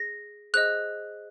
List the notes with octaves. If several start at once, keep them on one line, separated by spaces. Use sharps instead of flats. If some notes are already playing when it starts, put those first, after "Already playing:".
Already playing: G#4 A#6
G#4 C5 D#5 F#6